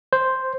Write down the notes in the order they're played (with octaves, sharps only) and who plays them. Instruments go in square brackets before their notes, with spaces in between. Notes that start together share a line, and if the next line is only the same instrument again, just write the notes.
[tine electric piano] C5